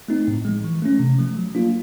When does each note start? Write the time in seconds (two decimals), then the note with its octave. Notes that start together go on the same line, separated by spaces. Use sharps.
0.08 A3 C4 D#4
0.28 A2
0.45 F3 G#3
0.64 E3
0.82 A3 C#4
1.00 C3
1.19 F3 A3
1.37 F#3
1.55 A#3 D4 F4